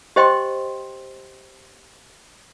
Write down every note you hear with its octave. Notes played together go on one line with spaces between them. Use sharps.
G4 C5 D#5 G5 C6